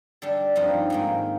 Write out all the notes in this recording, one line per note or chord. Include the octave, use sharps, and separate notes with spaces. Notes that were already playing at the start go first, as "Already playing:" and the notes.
D3 G3 D4
G2 F3 C4 D#4
G#2 D#3 A#3